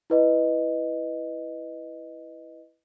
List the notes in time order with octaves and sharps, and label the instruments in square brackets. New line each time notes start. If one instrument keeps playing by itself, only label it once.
[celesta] E4 B4 D#5